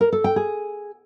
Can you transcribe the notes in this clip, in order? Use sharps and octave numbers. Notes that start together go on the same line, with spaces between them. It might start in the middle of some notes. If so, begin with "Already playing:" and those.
A#4
A4
G5
G#4